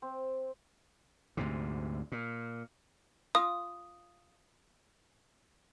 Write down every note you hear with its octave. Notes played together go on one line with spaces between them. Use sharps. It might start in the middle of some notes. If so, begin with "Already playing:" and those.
C4
D2 G#2 C3
A#2
F4 D#6